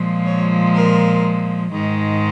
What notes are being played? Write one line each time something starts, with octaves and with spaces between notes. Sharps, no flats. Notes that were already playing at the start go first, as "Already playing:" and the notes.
Already playing: A#2 F3 G#3
C#5
A#4
G#2 D#3 G#3